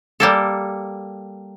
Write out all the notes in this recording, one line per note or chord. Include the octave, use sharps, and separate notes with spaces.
G3 A#3 A4